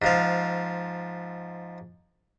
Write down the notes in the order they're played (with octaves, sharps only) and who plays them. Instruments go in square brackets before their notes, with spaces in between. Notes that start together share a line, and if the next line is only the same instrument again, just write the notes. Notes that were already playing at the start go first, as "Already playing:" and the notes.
[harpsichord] G#2 F3 F5